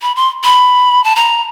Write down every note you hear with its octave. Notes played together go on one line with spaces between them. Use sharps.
B5
C6
B5
A5
A#5